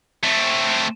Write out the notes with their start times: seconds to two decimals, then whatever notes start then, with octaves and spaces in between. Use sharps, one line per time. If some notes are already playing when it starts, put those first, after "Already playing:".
0.24 A3 C4